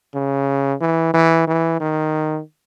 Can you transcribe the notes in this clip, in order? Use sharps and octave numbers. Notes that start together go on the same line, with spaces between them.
C#3
E3
E3
E3
D#3